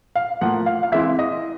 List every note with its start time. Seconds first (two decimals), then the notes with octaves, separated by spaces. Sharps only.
0.16 F5
0.41 A2 F3 A#3 F#5
0.66 F5
0.83 F5
0.92 E3 G#3 C4 E4 E5
1.19 D#5